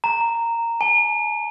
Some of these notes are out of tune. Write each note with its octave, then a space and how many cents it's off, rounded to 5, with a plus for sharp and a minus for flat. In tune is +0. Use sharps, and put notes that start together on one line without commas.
A#5 -10
G#5 +40